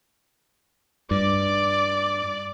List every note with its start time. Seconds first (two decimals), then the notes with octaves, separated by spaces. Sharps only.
1.11 G2 D5 D6